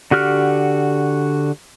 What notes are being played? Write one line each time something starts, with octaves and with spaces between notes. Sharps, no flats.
D3 F#4 G4 F6 F#6